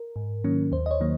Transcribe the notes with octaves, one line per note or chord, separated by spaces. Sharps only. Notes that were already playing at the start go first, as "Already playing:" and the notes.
Already playing: A#4
G#2
D#3 F#3 A#3 C#4
D#2 C5
D#5
C#5
D#3 F#3 A#3